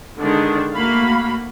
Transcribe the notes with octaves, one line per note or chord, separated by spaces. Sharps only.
D3 D#3 G#3 D4
A3 A#3 F#4 F5 B5